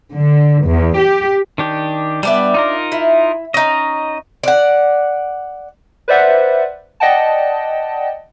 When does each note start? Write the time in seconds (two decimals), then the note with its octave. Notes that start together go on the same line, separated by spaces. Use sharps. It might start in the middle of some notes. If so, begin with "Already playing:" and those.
0.14 D3
0.64 E2
0.97 G4
1.58 D#3 D4 G4
2.23 G3 B3 D4 D5 E5
2.54 D#4 F4 A#4
2.92 E4
3.54 C#4 D#4 D#5
4.43 D5 F#5
6.08 B4 C5 D5 E5 F#5
7.00 D5 D#5 F#5 G5 A5